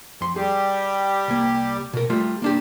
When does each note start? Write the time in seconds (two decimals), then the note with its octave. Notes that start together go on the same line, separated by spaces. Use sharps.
0.21 F2 C6
0.36 G3 G4 G#4
1.28 C2 A#3
1.94 B2 A#4
2.10 G3 A3 F4
2.42 A#3 D4 G4